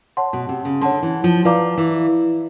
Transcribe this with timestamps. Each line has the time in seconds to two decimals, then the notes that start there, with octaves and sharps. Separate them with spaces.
0.17 C#5 F#5 A5 C6
0.33 B2
0.49 C3
0.65 C#3
0.81 D3 C#5 F#5 A5 C6
1.02 E3
1.24 F3
1.45 F3 B4 D5 F5 A#5 D6
1.77 E3